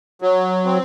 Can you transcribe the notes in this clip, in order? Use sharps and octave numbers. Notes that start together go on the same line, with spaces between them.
F#3
C4